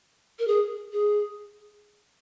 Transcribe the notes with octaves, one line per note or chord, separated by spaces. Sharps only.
A#4
G#4
G#4